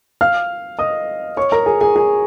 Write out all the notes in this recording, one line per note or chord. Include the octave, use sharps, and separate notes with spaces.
F5 F6
D#5 D#6
C#5 C#6
A#4 A#5
G#4 G#5
G#4 G#5
G#4 G#5